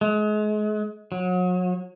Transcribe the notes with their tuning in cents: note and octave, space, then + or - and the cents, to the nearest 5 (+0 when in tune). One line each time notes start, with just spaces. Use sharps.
G#3 +35
F#3 -30